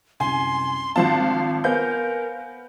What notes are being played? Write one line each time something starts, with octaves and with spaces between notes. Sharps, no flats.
C2 F#2 G#5 C6
G#1 F3 C4 D4 F4 F5 A5
B3 A#4 C5 F5 G#5 G6